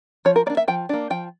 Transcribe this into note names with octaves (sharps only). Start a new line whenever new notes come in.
F3 C#5
A#4
A#3 D4 D5
E5
F3 G5
A#3 D4
F3 G5